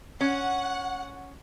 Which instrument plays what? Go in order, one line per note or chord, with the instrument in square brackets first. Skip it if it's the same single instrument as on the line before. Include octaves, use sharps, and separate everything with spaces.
[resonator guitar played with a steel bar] C#4 [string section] F#5